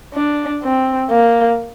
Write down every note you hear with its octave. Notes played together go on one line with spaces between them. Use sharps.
D4
C4
A#3